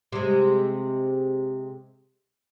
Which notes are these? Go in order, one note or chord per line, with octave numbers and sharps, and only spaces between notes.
C3 G#3